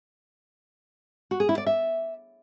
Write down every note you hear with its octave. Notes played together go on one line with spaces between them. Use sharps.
F#4
G#4
E4
D5
E5